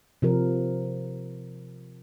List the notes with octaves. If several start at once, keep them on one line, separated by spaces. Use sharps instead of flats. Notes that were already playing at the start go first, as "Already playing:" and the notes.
C3 F3 A#4